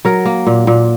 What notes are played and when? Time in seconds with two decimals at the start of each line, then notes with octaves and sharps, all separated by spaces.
0.05 F#3 A#4
0.25 A#3
0.47 A#2
0.67 A#2